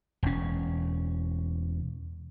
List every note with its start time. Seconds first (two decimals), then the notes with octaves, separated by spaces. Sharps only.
0.23 E1 C#4